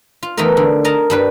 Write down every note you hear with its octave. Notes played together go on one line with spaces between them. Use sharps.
F4
E2 E3 A3 D#4 A#4
D3
A#4 D#5 A5 A#5
G2 G3 B4